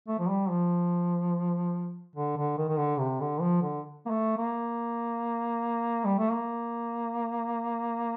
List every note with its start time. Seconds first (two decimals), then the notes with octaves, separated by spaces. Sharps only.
0.08 A3
0.19 F3
0.29 G3
0.49 F3
2.16 D3
2.37 D3
2.57 D#3
2.69 D#3
2.78 D3
2.99 C3
3.20 D3
3.40 F3
3.62 D3
4.06 A#3
4.10 A3
4.37 A#3
6.05 G3
6.19 A3
6.32 A#3